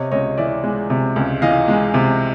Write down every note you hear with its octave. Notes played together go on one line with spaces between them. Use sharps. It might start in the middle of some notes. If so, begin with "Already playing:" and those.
Already playing: C3 C#5 D#5
C#2 C#5 D#5
E3 D5 E5
G#3
C3
C#2
E3 D#5 F5
G#3
C3